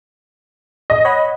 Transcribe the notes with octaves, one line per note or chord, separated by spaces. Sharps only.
D#5
C#5 F#5 B5